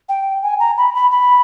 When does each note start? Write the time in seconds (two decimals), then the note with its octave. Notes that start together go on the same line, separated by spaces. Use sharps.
0.09 G5
0.42 G#5
0.60 A#5
0.78 B5
0.95 B5
1.11 B5